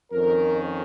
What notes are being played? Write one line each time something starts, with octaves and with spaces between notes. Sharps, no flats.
F2 D#3 C#4 A#4